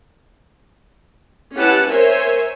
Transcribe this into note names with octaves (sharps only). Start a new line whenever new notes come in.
C#4 E4 G4 B4 F#5 A5
A#4 C5 C#5 E5 G#5